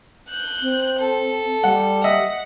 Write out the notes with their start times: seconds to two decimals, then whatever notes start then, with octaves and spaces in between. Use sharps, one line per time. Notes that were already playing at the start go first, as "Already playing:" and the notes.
0.30 F#6 G6
0.62 C4
1.00 A4
1.64 G3 F#5
2.04 D#5 E5 F#5